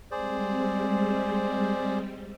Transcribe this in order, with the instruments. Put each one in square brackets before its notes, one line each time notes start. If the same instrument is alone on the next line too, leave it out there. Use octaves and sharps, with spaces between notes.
[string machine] G3 G#3 C4 [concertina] G#4 C5 D5